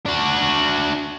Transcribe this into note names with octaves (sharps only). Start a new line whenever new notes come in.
D4 F#4